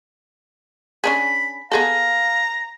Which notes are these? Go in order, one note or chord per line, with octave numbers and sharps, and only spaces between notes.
C#4 D4 G#4 B5
B3 G#4 A4 F5 A#5